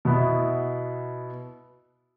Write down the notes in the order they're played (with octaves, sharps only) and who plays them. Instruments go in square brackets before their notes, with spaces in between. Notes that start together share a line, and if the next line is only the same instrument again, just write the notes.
[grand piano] B2 B3 E4